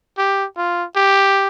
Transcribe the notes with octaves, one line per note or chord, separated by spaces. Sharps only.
G4
F4
G4